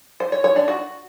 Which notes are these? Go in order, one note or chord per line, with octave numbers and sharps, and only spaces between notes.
C5
C#5
C#5
D4
F#4